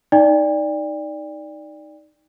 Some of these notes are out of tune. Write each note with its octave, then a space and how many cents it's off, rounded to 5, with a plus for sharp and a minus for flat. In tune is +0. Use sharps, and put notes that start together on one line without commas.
D#4 +0 D5 +0 G5 +40